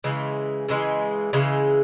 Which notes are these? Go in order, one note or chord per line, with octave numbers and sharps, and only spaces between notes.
C#3 E3 G#3
C#3 E3 G#3
C#3 E3 G#3